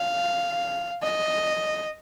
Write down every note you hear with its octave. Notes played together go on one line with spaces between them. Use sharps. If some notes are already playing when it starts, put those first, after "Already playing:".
Already playing: F5
D#5